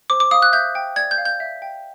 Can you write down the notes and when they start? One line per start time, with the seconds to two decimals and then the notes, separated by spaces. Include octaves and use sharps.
0.10 C5 D6
0.20 D6
0.31 F5 D#6
0.42 F#6
0.53 E5 G6
0.75 G5
0.96 D5 G#6
1.11 G6
1.18 F5
1.25 G6
1.40 E5
1.62 G5